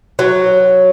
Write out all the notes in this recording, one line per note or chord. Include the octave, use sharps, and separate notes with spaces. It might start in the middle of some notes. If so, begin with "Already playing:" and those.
F#3